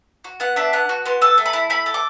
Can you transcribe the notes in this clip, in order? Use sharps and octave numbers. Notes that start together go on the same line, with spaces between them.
F#4
B3 F#5
D4 E5
B3 F#5
F#4
B3 C6
A4 E6
A3
B5
E4
A3 B5
A4
D6